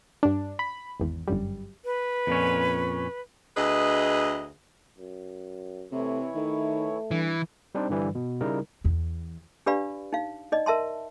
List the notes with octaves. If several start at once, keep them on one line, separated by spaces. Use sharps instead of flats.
G2 D4
B5
G#1 E2
G1 F#2 G3
B4
F2 A#2 C#4
D2 G#4 B4 D#5
F#2
C3 E3 A3 E4 C#5
D#3 A3
G2 E3
G3 C4 D4 D#4 G4 C5
G2 D3 E3 G3
B2
C#3 G3 D#4 E4 A#4
E2
D4 G4 B4 D5 F5 B5
D#4 F5
D#4 D5 D#5
A#4 E5 A5 C6